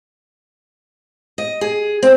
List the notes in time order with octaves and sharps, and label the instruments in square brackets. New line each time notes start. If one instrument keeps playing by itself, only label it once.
[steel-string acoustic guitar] D#5
G#4
C4